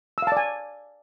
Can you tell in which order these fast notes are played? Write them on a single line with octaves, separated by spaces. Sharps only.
E6 F5 A5 D5 G#5